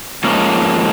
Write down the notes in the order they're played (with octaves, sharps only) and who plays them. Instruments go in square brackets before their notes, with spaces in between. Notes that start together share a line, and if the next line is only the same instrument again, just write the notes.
[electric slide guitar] G#2 F3 G#3 A#3 C#4